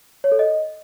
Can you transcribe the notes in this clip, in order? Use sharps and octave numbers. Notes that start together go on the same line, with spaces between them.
C#5
A4
D#5